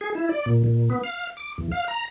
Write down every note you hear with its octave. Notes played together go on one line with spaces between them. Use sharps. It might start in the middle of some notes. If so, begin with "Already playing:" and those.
G#4
E4
D5
A#2
A#2
B3
F5
D6
E2
F5
A#5